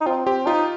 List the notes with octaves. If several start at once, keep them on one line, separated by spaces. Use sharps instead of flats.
D#4
C4 F4
C4 G4
D#4 F4